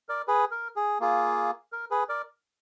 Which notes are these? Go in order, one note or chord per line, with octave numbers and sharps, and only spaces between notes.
A#4 D5
G#4 B4
A#4
G#4
A#3 F4 G#4
A#4
G#4 B4
A#4 D5